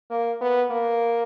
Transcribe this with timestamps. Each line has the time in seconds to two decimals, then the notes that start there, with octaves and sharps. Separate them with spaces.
0.11 A#3
0.41 B3
0.71 A#3